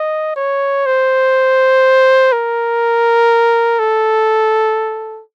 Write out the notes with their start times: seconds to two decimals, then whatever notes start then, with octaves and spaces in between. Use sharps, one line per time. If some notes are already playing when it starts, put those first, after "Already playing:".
Already playing: D#5
0.36 C#5
0.86 C5
2.32 A#4
3.79 A4